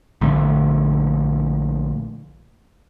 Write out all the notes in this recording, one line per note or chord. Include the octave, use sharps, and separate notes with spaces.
A#1 D3 A3